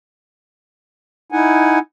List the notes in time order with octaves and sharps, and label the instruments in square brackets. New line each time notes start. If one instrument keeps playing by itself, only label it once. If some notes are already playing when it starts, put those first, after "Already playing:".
[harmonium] D#4 E4 F#5 G#5